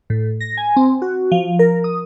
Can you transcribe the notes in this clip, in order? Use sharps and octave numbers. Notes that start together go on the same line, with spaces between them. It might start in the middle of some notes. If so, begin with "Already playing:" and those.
A2
A#6
G#5
C4
F#4
F3
A#4
D#6